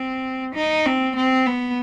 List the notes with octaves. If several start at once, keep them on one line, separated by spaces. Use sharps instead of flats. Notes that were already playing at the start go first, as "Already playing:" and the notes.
Already playing: C4
D#4
C4
C4
B3